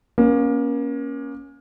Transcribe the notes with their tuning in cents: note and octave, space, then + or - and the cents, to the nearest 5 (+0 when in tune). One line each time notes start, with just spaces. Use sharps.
A#3 +30 C#4 +0